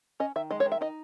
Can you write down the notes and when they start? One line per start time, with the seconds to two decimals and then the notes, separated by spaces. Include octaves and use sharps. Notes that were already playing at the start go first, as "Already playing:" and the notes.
0.20 C#4 D#5
0.36 D#3 E5
0.51 G#3 D#5
0.60 C#5
0.66 D#3
0.72 E5
0.81 D#4 D#5